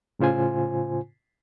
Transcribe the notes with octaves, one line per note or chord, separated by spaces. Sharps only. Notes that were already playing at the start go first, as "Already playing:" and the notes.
A2 C#3 F4 C5 G#5